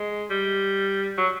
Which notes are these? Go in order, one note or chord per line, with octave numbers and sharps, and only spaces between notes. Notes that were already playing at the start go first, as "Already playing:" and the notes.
Already playing: G#3
G3
F#3